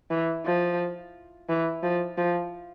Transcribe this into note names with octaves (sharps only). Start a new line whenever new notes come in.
E3
F3
E3
F3
F3